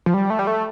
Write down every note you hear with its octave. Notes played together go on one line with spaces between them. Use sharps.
F3
G3
A3
G3
A3